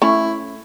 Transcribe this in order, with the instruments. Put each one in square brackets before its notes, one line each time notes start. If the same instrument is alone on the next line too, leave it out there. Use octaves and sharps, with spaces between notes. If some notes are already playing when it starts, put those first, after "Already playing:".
[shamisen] A3 C#4 [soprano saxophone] E4